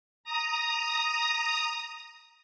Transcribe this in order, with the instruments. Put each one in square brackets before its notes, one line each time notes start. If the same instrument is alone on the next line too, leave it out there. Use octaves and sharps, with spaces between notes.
[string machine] A#5 D#6